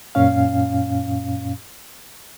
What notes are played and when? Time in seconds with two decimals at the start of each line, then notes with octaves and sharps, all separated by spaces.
0.15 F#2 A#2 C#4 F5